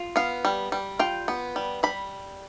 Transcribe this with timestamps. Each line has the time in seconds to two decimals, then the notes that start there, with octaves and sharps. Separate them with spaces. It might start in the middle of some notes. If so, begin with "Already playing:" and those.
Already playing: F4
0.16 B3 F5
0.45 G3
0.72 G3
0.99 F4 G5
1.28 B3
1.56 G3
1.83 G3 B5